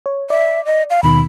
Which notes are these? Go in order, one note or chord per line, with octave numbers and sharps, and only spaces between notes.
C#5
D5 E5
D#5
F5
D#2 B2 D#3 B5